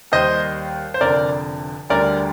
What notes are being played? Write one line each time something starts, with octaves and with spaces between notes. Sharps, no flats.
D#2 D#3 G3 C5 D#5
C5
F1 F2 D3 A#4 D5
D2 D3 G3 A#4 D5